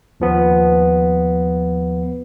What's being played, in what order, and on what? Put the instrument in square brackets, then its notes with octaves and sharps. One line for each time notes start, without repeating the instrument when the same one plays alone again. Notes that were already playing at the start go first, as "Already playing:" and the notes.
[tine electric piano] D#2 F3 B3